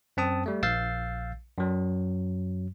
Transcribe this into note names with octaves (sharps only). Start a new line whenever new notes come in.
F#2 C4 A5 D#6
G3 A3
A#1 F5 E6 G6 A6 C7
F#2 F#3